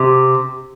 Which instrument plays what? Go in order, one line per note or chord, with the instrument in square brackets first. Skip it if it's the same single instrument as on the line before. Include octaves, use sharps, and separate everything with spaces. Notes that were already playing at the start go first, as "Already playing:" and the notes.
Already playing: [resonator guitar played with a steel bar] C3